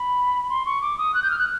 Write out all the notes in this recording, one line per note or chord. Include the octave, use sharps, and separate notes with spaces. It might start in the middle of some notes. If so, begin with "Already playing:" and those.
Already playing: B5
C6
C#6
D6
D#6
F#6
G6
F6
F#6